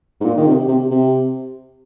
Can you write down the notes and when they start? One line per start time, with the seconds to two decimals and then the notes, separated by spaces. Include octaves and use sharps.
0.21 G#2
0.25 A#2
0.37 D#3
0.47 C3
0.68 C3
0.91 C3